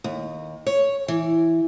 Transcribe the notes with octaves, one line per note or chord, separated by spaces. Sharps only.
D#2
C#5
E3